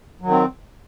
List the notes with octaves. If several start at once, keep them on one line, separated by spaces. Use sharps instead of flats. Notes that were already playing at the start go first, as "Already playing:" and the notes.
D#3 F#3 C4